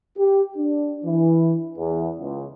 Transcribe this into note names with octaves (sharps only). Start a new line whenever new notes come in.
G4
D4
E3
E2
C#2